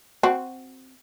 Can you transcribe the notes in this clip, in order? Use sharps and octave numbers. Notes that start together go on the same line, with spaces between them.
C4 F#4